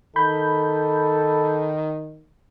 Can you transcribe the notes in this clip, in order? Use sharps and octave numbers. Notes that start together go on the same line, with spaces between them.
D#3 A4 B5 G6